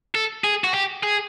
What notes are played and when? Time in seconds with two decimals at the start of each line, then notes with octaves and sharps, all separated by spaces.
0.15 A4
0.44 G#4
0.64 F#4
0.74 G4
1.03 G#4